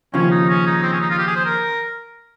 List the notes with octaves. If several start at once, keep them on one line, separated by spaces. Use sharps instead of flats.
D#2 C#3 F3 C#4
D#4
C#4
D#4
C4
C#4
D#4
F4
G4
G#4
C5
A#4